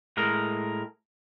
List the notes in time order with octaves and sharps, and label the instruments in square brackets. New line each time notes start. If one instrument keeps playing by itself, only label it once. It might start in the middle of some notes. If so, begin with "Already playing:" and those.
[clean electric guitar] A2 G#3 A#4